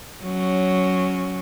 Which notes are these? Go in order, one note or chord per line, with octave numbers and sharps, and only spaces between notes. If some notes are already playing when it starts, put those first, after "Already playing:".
F#3 C#4